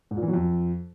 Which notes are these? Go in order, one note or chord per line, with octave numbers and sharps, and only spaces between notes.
G#2
A#2
E3
F#3
F2